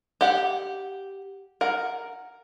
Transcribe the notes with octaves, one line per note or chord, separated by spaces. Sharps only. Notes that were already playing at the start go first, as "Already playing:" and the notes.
G4 F#5
A#4 F#5